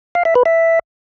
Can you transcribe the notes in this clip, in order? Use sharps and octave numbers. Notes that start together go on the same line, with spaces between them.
F5
E5
B4
E5